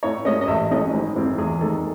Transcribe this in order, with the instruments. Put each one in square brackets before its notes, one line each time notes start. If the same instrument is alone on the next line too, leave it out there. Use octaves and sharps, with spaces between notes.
[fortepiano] A2 C#5
G#3 C#4 D#5
D#5
A1 E5
A2 G#3 C#4 D#5
G#1
G#2 E3 C4
E2 G#4
D#3 G#3 A4